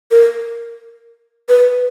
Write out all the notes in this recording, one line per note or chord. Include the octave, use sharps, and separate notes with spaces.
A#4
B4